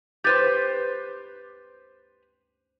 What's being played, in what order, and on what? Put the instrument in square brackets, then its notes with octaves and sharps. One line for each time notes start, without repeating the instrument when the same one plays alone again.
[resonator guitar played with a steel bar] G4 B4 C5 [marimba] G6 A6